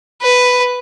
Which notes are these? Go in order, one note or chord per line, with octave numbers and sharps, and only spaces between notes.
B4